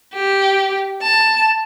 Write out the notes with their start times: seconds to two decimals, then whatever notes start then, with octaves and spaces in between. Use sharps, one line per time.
0.14 G4
1.03 A5